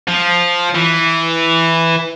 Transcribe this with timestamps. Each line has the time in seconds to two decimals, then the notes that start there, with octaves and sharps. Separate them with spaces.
0.09 F3
0.75 E3